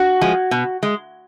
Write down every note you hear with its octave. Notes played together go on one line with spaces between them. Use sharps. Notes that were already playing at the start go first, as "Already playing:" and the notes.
Already playing: F#4
F3 G#3
B2
G#3